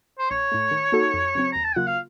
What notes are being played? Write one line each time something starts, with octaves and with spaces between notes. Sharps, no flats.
C5
A#1 C#5
A2 A3
D#3
A#3 D#4 F#4 A4
F2
C#3 F#3 C4
D#2 A#5
A5
C#3 F#3 A#3 F4 F#5
F5